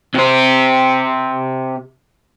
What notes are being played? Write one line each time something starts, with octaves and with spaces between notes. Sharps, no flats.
C3 C5